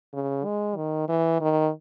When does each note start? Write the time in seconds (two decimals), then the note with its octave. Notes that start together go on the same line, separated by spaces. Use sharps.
0.13 C#3
0.45 G#3
0.76 D#3
1.09 E3
1.41 D#3